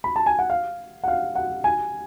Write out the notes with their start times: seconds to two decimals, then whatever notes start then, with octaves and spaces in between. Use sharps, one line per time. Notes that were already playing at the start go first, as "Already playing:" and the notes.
0.04 B5
0.16 A5
0.26 G#5
0.39 F#5
0.50 F5
1.04 F#5
1.08 F5
1.35 F#5
1.64 G#5